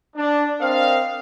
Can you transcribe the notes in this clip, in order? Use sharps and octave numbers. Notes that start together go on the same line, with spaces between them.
D4
C4 A#4 C5 D#5 F5